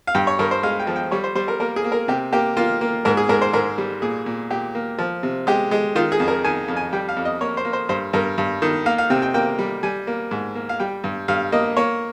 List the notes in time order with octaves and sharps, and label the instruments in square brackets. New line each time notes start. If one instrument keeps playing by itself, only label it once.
[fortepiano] F5
G2 G5
C#5
G2 A#4
C5
G#3 F5
G5
F3
G5
G3 C#5
C5
G3 C5
A#4
A#3 A#4
G#4
A#3
A#4
C3 G4
A#3 G4
A#3 F4
A#3
G#2 A#4
G#4
G#2 A#4
C5
G#2 A#4
G3
A#2 G#4
A#2
A#2 G4
A#3
F3
C3
G#3 G4
G#3
D#3 F4
G#4
F2
A#4
D#3 G#5
F2
G#5
G3 G5
F5
F2
D#5
A#3 C#5
C5
A#3
C5
G2 C5
G2 A#4
G2
D#3
A#3 F5
F5
C3 G5
G5
A#3 G5
G3
G3 G#5
A#3
G#2
A#3
F5
G3 G5
G2
G2 F5
A#3 D#5
A#3 C#5